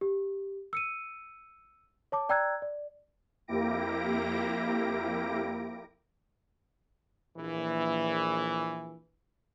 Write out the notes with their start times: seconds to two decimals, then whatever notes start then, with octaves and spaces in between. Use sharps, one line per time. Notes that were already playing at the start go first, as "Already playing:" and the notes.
0.01 G4
0.73 E6 C#7 D#7
2.12 C#5 A5 D6
2.29 D5 G5 A#5 E6 F#6 G#6
2.62 D5
3.48 F2 A#3 E4 G4 A#6 D7
7.37 A#1 E3